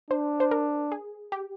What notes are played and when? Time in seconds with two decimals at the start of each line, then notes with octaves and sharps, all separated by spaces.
0.10 D4 C5
0.40 C5
0.51 A#4
0.92 G#4
1.32 G4